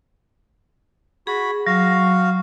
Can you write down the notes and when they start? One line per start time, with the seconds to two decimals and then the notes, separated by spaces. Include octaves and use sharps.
1.27 F#4 G#4 B5
1.67 F#3 F#4 F5